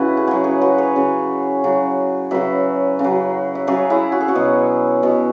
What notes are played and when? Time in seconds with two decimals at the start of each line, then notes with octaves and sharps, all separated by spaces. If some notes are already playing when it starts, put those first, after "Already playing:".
Already playing: C#3 E4 F#4 B4 C#5
0.17 G#4
0.27 C#3 F#3 C#4 F#4
0.44 G#4 C#5
0.61 F#4 B4
0.78 G#4 C#5
0.96 C#3 F#3
1.64 C#3 F#3
2.31 C#3 F#3 B4 E5
2.99 C#3
3.04 F#3
3.55 E5
3.67 C#3 F#3 G#4 C#5
3.90 E4 G#4
4.12 F#4
4.21 G#4
4.28 C#4 F#4
4.35 B2 F#3
5.03 B2 F#3